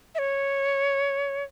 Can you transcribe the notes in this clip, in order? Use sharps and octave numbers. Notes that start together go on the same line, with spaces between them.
E5
C#5